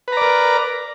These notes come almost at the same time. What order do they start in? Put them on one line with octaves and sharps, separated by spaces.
B4 A#5 D5 A#4